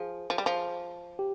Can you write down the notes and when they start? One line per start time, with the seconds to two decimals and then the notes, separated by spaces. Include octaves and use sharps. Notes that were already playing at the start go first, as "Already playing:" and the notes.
Already playing: F3 G#4
0.30 F3
0.38 G3
0.46 F3
1.19 G4